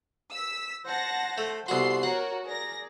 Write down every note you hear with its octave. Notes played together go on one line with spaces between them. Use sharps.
E6 B6
C5 F#5 A5 A#6
A3
C2 B3 F#4 A4 C6 C7
F#4 A#4 C#5 F#5
G#4 A#4 D5 A#6